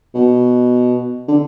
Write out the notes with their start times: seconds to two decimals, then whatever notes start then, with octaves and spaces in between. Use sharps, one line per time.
0.14 B2
1.28 D3